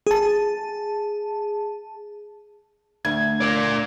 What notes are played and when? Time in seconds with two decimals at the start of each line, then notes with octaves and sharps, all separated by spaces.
0.07 G#4 A5
3.05 D2 G#6
3.41 A#4 D5